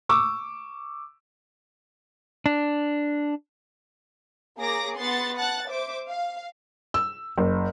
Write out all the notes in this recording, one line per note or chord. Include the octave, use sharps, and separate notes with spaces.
C#6 D6 E6
D4
A#3 G#4 C#5 A#5 D6 A#6
B3 F#5 C6 A6
F#5 A5 F#6 A6
C5 E5 D6
F5
E6
F#1